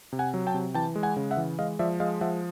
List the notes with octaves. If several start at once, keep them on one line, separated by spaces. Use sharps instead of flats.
C3
F#5 G#5
F#3
G5 A5
C3
E3 G5 A5
G#3
F#5 G#5
C#3
E5 F#5
E3
G#3 D#5 F5
F3 D5 E5
G#3 D#5 F5
F3 E5 F#5